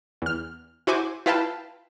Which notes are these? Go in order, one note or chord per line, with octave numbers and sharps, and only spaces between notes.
E2 F6
E4 F#4 C5 G#5 D6
E4 F4 B4 F5 G5 A5